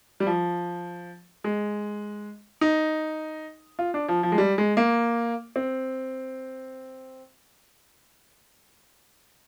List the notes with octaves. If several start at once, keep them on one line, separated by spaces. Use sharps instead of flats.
G3
F3
G#3
D#4
F4
D4
F3
F3
G#3
G3
G#3
A#3
C4